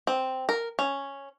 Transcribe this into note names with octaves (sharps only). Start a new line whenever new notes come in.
C4
A#4
C#4